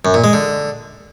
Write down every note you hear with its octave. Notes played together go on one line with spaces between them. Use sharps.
F#2
A#2
G#3
D3